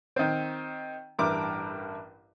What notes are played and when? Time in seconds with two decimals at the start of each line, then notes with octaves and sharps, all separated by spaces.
0.16 D#3 C4
1.19 A1 G2 E4 A#4 D6